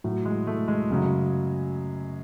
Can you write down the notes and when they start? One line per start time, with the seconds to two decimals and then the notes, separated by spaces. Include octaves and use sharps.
0.04 A2 F#3
0.25 G#3
0.47 A3
0.68 G#3
0.90 F#2 C#3 F#3